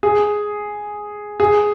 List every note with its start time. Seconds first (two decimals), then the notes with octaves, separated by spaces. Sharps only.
0.03 G#4
1.40 G#4